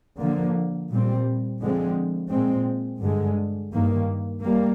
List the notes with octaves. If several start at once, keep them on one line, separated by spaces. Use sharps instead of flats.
D3 F3 A#3
A#2 G3 C4
D3 F3 G#3 C4
A#2 G#3 C4
G2 D3 G#3
G2 D#3 A#3
G3 A#3